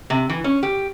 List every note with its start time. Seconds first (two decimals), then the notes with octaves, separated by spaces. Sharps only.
0.10 C3
0.30 E3
0.44 C#4
0.63 G4